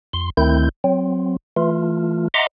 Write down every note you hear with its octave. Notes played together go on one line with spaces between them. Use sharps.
F2 C6
D2 D#3 A3 C4 E4 G6
F#3 C4
E3 A3 F4
D#5 E5 F#5 A#5 C6 D6